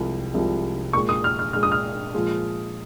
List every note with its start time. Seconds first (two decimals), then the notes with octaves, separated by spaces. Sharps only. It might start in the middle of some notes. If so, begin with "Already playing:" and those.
Already playing: C2 C3 F3 G#3
0.34 C2 C3 F3 G#3
0.93 A#2 G#3 C#6
1.09 D#6
1.24 F6
1.39 F6
1.53 A#2 G#3 F6
1.63 D#6
1.72 F6
2.14 A#2 F3 G#3